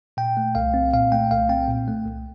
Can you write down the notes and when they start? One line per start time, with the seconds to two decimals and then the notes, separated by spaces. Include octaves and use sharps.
0.17 A#2 G5
0.37 A3
0.55 C2 F5
0.74 C4
0.94 A#2 F5
1.12 A3 G5
1.31 C2 F5
1.49 C4 G5
1.69 A#2
1.88 A3
2.06 C2